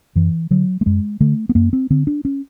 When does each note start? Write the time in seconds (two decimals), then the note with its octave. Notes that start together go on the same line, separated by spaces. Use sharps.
0.16 F#2 E3
0.51 D3 F#3
0.81 A3
0.86 F#2 G#3
1.20 D3 A3
1.49 B3
1.55 F#2 A#3
1.73 C4
1.90 D3 C4
2.07 D4
2.25 C#4